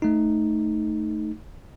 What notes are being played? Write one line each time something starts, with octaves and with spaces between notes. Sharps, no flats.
A3 D#4